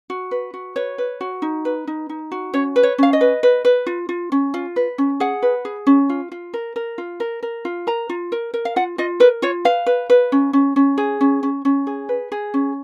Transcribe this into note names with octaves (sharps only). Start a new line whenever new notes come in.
F#4
B4
F#4
B4 C#5
B4
F#4
D#4
B4
D#4
D#4
F#4
C#4 C#5
B4
C#5
C#4 F5
D#5
B4
B4
B4
F4
F4
C#4
F4
B4
C#4
G#4 F#5
B4
G#4
C#4
F4
F4
A#4
A#4
F4
A#4
A#4
F4
A#4 A#5
F4
A#4
A#4
F5
F4 F#5
F4 D#5
A#4 B4
F4 C#5
B4 F5
B4
B4
C#4
C#4
C#4
G#4
C#4
C#4
C#4
G#4
B4
G#4
C#4